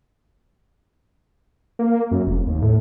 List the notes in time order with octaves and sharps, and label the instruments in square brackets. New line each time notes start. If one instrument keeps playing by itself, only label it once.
[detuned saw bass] A#3
F#2
F1
D#2
A2